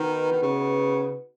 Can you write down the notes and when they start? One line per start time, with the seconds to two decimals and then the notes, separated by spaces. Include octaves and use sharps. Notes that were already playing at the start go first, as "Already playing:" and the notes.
Already playing: D#3 B3 D#4 F#4 B4
0.32 D#3
0.42 C#3